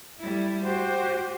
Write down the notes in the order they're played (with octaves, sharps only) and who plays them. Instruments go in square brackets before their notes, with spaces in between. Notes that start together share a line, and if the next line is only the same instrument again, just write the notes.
[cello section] G3 A3 E4
[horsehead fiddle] F#4 G4 [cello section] C5